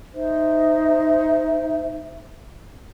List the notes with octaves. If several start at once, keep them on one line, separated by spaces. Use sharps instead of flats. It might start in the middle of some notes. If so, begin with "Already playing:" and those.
D#4 C5 E5